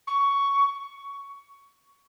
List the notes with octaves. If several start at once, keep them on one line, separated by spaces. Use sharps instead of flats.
C#6